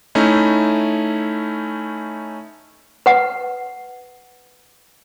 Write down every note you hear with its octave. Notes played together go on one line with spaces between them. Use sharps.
A3 C#4 D#4 E4
B4 F#5